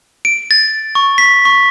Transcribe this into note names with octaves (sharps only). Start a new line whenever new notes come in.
D7
A6
C#6
B6
C#6